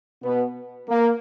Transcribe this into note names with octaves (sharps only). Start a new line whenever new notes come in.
B2 B3
A#3